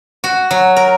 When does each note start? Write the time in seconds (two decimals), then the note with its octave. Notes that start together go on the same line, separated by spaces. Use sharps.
0.24 F#4
0.51 F#3
0.76 A#4